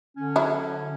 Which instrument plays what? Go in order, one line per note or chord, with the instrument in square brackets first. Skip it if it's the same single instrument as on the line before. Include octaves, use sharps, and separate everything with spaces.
[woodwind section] D3 C#4
[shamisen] F#3 E4